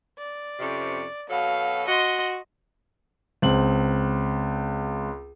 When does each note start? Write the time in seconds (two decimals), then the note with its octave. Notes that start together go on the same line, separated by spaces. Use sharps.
0.19 D5
0.59 F2 C3 C#4
1.29 B2 F#3 A4 F5
1.88 F#4 D#5 C6
3.42 C#2 C4 F#7